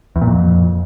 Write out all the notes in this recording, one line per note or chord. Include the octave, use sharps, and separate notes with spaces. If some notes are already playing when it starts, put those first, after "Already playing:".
E2
A#2
F2